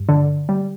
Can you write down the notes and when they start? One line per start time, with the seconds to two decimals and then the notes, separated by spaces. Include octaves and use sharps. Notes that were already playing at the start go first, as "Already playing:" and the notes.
Already playing: G2
0.09 D3
0.49 G3